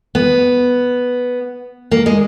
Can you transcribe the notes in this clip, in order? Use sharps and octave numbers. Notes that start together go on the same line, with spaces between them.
B3
A#3
G#3